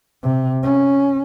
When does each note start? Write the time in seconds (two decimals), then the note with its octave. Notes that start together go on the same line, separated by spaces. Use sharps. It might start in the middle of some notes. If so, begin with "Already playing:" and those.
0.23 C3
0.63 C#4